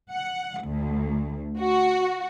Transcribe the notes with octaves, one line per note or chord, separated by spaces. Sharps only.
F#5
D2
F#4